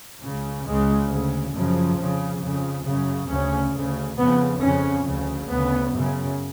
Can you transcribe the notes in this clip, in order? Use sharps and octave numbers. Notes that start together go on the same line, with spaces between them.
C#2 C#3
C#2 C#3 G#3
D2 C#3
F#2 C#3 F3
F2 C#3
F2 C#3
F#2 C#3
D2 C#3 C#4
D2 C#3
F2 C#3 B3
F2 C#3 C#4
D2 C#3
D2 C#3 B3
F#2 C#3